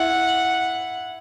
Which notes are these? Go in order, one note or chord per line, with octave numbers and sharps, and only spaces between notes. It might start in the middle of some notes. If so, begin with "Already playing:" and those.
Already playing: E4 F#5